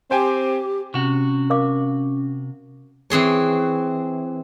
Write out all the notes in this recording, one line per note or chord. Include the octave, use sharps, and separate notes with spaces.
C4 G4 C5 G5 G#5
C3 C#4 F#4
A#4 F5 D6
E3 C4 G#4 C#5